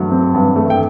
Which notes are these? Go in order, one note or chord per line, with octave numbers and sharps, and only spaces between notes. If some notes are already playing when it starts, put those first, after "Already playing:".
Already playing: G2 F#3 A3
C4
G2
A3
G5